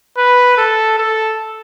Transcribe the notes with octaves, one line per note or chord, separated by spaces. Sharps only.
B4
A4
A4